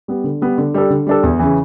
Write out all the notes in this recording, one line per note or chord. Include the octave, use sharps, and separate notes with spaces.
G3 B3
D3
G3 B3
D3
G3 D4 A4
D3
G3 D4 A4
E2
C#3 E3